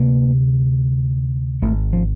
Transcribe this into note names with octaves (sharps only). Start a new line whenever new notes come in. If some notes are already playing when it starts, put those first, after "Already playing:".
Already playing: D2 C3 A#3
G#1 G#2 A3
F3